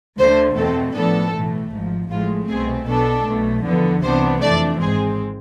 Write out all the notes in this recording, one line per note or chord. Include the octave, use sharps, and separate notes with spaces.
D2 D3 A3 C5
E2 B2 A3 C4 A4
A2 F3 B3 D4 A4
B1 A2 E3 A3
G#1 G#2 F3
A1 A2 F3 G#3 F4
C2 B2 A3 C4 G#4
B1 B2 B3 D4 A4
B1 B2 A3
E2 D3 F3 B3
C2 C3 E3 B3 D4 C5
F2 E3 A3 D4 D5
G#1 G#2 G#3 C4 G#4